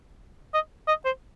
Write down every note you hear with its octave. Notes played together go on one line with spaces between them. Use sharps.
D#5
D#5
C5